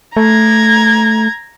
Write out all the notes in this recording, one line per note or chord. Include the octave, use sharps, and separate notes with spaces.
A3 A#5 G#6